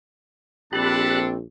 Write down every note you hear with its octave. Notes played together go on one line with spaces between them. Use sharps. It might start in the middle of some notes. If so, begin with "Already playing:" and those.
A#1 C4 D4 G4 A4 A5 B5 F#6